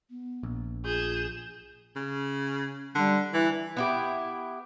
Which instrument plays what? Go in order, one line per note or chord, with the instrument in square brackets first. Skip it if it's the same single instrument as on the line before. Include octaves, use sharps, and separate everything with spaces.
[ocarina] B3
[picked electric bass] A#1
[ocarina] F4 [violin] G#4 E7 [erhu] G6
[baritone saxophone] C#3
[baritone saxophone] D3 [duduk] G3
[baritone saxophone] E3 [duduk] E4
[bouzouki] B3 E4 G4